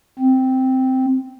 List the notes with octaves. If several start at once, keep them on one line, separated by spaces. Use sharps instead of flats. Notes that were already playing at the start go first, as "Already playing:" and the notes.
C4